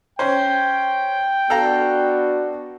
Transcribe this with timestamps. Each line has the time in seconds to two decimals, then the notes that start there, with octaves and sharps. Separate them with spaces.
0.19 C#4 C5 G5
1.50 B3 D4 F#4 A4 F5 A#5